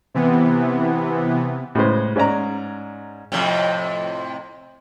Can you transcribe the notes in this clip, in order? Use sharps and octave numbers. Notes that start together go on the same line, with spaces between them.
C3 E3 B3
A2 C#3 G#3 B4 C5
G#2 C#4 D5 A#5
F2 A2 C3